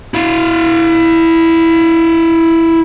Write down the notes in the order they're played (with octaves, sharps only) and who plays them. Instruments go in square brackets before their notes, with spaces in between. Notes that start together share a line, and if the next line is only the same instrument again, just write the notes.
[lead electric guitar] E4 F5